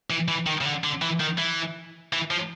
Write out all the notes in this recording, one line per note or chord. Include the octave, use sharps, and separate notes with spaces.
E3
E3
D#3
C#3
D3
D3
E3
D#3
E3
E3
F3